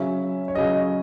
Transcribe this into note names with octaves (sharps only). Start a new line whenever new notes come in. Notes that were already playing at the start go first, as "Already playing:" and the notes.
Already playing: C#3 F#3 C#4 E5
C#5
C#3 F#3 C#4 D#5